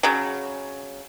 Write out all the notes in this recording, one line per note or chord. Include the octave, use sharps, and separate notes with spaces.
C#3 F#3